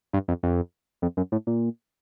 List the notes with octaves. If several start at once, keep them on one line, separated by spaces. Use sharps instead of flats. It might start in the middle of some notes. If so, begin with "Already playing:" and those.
G2
F2
F2
F2
F#2
A2
A#2